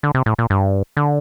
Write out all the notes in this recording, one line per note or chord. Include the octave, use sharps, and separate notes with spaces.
D3
C3
A2
A#2
G2
D3